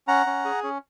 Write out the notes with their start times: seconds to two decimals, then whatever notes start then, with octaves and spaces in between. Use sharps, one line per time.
0.08 C#4 F#5 A#5
0.26 C#4
0.45 G#4
0.63 C#4